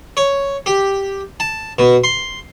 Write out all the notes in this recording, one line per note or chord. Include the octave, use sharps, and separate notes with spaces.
C#5
G4
A5
B2
C6